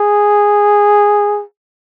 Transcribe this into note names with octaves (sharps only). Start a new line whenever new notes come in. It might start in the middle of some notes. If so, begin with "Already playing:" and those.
Already playing: G#4